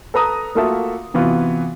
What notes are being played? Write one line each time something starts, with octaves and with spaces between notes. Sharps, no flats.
A4 B4 A#5 D#6
A3 A#3 F4 F#4 A4 E5
C3 E3 B3 F4 F#4